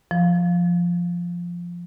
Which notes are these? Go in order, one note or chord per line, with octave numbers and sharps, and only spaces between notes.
F3